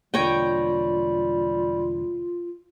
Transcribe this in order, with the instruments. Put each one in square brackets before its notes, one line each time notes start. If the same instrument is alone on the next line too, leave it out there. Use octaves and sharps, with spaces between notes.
[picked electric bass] E1 D3 A#3 [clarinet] G3 [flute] F4 [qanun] C#5 D#5 G5